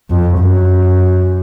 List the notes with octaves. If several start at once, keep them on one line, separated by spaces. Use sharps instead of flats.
F2
F#2